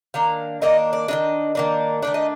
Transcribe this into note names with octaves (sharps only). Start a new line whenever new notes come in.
D#3 A#3 D4 F5
D#3 A#3 D4 D#5
D5
D#3 A#3 D4 D#5
D#3 A#3 D4
D#3 A3 D4 D5
D#5